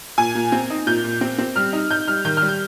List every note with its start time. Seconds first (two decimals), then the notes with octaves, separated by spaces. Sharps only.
0.18 A#2 G#5
0.35 A#2
0.52 C4
0.70 D#4
0.87 A#2 G6
1.04 A#2
1.21 C4
1.39 C4
1.56 G3 F6
1.73 D#4
1.90 D#4 G6
2.08 G3 F6
2.25 D#3 G6
2.37 F6
2.42 G3
2.49 G6